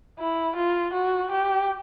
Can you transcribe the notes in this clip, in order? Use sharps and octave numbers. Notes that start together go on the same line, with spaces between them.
E4
F4
F#4
G4